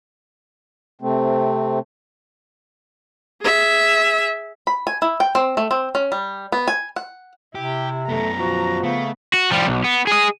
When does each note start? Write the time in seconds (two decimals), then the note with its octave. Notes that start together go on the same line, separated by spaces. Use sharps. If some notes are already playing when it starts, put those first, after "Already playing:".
1.02 C3 A3 C4
3.42 G#4 E5
4.67 B5
4.87 G#5
5.02 E4
5.20 G5
5.35 C4
5.57 A3
5.71 C4
5.95 C#4
6.12 G3
6.52 B3
6.68 G#5
6.96 F#5
7.55 C3 E4 G4
8.09 F#2 A3 B3 A#5
8.39 F3 F#4
8.83 C#3 A3 B3
9.34 F#4
9.51 F3 G3
9.67 B1
9.84 B3
10.07 G#4 D#5